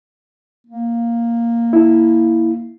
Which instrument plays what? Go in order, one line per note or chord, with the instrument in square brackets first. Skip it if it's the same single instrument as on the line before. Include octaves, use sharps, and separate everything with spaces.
[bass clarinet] A#3
[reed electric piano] E4